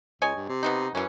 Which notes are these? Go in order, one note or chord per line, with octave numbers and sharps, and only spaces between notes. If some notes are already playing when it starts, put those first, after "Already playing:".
C#2 C#5 D#5 G#5
G2
C3
B2 B3 D#4
F#2 E3 C#4